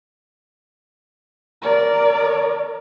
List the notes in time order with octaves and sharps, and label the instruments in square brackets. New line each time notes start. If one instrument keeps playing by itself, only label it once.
[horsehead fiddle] A#4 D5